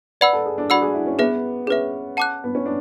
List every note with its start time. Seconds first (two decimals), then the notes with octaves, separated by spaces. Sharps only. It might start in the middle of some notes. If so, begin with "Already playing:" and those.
0.21 B4 D5 F#5 B5 E6
0.33 A4
0.46 G#4
0.58 D4
0.70 F#4 D5 F#5 B5 E6
0.82 G#4
0.94 E4
1.07 C#4
1.19 B3 G#4 B4 E5
1.67 C#4 G#4 B4 E5
2.17 F#5 A5 D6 F#6
2.44 B3
2.55 C#4
2.66 D4